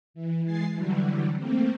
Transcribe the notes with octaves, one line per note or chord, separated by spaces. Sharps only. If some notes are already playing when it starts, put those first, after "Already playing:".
E3
E3 G#3 G#5 A6 C7
D3 E3 F#3 G3
A3 A#3 C4